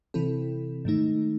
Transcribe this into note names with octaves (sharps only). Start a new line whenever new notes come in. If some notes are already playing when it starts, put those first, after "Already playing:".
C3 E3 C4 E4 A4
G#2 D#3 A3 D#4